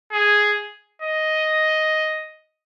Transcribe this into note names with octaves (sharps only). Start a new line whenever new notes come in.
G#4
D#5